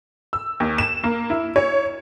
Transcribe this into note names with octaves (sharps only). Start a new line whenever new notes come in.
E6
D#2
E7
A#3
E4
C#5